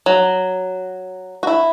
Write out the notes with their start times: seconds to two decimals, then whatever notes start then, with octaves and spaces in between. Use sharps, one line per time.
0.06 F#3
1.43 F#4
1.47 E4